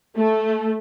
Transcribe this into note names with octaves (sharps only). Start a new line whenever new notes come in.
A3